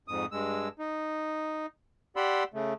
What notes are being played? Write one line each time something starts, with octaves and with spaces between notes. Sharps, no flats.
F2 G#2 D#6
G2 G#3 E6
D#4
G4 D5 F#5 B5 C6 E6
C#3 A3